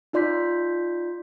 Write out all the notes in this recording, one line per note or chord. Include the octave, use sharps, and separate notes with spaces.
D#4 F4 D5 C6 G6 B6